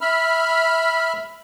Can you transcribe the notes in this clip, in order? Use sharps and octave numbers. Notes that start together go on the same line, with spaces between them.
E5 B5 F6